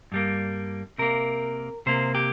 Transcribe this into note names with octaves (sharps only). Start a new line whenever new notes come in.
G2 G3 A#3
C3 A#3 A#4
C3 A#3 C5
G4